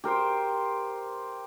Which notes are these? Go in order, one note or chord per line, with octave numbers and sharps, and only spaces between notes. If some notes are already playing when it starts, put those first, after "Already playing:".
G4 A#4 C5 G5